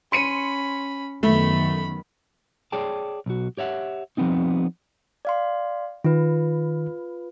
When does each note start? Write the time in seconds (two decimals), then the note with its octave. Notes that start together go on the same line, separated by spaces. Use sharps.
0.12 C#4 B5 C6 C#7 D#7
1.23 F#2 D#3 A3 B3 B5
2.72 G#4 C#5 D5 G5 A5
3.26 B1 F#4
3.57 G4 C#5 E5 F#5
4.17 F3 G3 B3 C4 D#4
5.25 D5 F5 C6
6.04 D#3 F4 B4